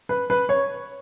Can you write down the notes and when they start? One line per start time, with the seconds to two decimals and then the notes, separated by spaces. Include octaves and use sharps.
0.09 B4
0.30 B4
0.49 C#5